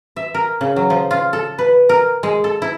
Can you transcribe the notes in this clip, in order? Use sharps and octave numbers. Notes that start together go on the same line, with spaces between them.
E5
A#4
C#3
F#3
F3
F4
A4
B4
A#4
G#3
A4
E4